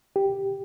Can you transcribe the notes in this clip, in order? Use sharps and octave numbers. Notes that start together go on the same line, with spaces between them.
G4